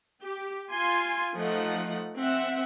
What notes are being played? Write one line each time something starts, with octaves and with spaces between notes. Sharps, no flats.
G4
F4 G#5 C6
F3 A3 D#4 F#5
C4 E5 F#5